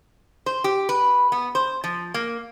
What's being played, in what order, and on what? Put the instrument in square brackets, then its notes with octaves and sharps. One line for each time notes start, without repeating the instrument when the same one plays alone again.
[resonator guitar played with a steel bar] C5
G4
B4
B3
C5
F3
A#3